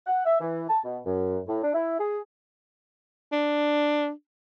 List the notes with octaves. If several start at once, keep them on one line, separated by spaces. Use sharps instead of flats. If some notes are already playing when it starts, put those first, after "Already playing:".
F#5
E5
E3
A5
B2
F#2
A2
D4
E4
G#4
D4